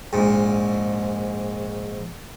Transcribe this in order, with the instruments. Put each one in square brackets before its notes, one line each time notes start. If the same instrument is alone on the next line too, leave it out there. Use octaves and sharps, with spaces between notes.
[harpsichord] A#1 G#2